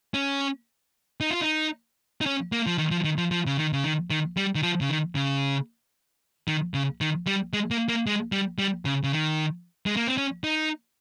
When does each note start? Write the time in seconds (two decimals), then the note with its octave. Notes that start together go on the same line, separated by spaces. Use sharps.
0.14 C#4
1.21 D#4
1.31 F4
1.41 D#4
2.21 D#4
2.26 C#4
2.52 A#3
2.67 F3
2.78 D#3
2.91 F3
3.04 D#3
3.18 F3
3.31 F3
3.46 C#3
3.57 D#3
3.73 C#3
3.84 D#3
4.10 D#3
4.37 G3
4.55 D#3
4.63 F3
4.81 C#3
4.89 D#3
5.15 C#3
6.48 D#3
6.74 C#3
7.01 D#3
7.27 G3
7.53 G#3
7.71 A#3
7.89 A#3
8.07 G#3
8.32 G3
8.59 G3
8.85 C#3
9.04 C#3
9.12 D#3
9.86 G#3
9.96 A#3
10.08 C4
10.18 C#4
10.44 D#4